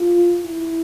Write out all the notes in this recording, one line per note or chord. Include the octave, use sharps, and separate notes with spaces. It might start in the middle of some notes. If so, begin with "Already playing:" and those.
Already playing: F4
E4